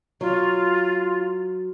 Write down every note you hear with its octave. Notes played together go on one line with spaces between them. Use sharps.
F#3 F4